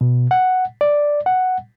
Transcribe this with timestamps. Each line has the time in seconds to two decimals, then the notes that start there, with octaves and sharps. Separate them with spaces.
0.01 B2
0.31 F#5
0.81 D5
1.26 F#5